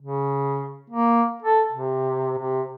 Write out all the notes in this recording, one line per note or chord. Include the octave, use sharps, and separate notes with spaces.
C#3
A#3
A4
C3
C3